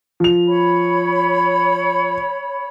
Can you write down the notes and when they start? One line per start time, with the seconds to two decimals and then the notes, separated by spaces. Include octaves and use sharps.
0.20 F3 F7
0.47 C#5 B5